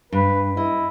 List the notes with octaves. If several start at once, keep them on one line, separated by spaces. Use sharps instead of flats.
G2 B4
E4 D#5